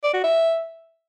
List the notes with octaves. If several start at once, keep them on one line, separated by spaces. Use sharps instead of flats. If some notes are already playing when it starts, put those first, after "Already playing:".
D5
F#4
E5